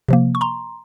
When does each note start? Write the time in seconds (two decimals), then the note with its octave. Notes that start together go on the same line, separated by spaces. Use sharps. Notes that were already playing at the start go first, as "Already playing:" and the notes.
0.08 C3 F3 A#3
0.35 C#6
0.41 A#5 C6